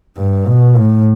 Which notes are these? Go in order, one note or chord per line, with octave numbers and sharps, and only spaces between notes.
G2
B2
A2